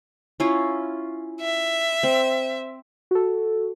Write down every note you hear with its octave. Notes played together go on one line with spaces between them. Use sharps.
C#4 E4 F4
E5
C4
F#4 A4